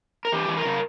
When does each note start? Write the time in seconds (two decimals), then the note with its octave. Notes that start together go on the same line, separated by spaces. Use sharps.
0.25 A#4
0.32 E3 G4
0.48 E3
0.57 A#4
0.65 C#3